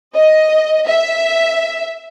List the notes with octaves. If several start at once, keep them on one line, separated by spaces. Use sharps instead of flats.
D#5
E5